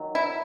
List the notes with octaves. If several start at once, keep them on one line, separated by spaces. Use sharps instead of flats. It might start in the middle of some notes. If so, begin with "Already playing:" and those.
Already playing: D#3 F#3
E4